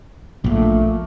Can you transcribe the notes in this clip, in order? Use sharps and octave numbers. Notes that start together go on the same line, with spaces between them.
A#1 A#2 A3